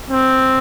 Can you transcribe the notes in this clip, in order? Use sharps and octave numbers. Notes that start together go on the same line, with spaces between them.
C4